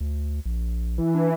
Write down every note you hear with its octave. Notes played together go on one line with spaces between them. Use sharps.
D2
A#1
E3
D4